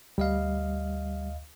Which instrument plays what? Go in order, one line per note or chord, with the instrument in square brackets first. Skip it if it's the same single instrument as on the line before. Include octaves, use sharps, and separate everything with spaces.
[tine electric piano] D2 D#5 F5 [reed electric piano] G3